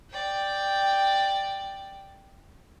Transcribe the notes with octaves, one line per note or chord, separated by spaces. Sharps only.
D5 G5